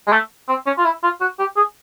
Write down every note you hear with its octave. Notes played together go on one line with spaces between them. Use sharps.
G#3
A3
C4
C#4
F4
E4
F4
F#4
G4
G#4